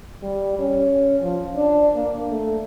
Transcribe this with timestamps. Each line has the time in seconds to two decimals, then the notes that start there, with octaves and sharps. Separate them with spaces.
0.23 G3
0.59 C#4
1.23 F3
1.56 D4
1.95 A#3
2.31 A3